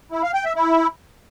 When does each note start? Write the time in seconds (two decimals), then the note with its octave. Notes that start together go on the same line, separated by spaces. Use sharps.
0.12 E4
0.23 F5
0.34 G5
0.45 E5
0.56 E4